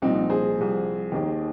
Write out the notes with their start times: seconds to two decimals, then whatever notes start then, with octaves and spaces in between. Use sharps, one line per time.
0.02 C2 A#2 F3 C4 D#4
0.30 G#4 C5
0.57 C2 C3 F3
1.12 D#2 D#3